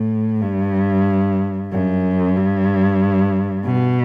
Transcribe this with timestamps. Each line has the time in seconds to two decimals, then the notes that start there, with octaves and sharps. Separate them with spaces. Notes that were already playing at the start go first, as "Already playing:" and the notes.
Already playing: A2
0.42 G2
1.72 F#2
2.36 G2
3.65 B2